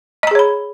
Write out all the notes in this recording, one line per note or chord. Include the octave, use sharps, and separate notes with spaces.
G#4 C#5 D#5 A#5 B5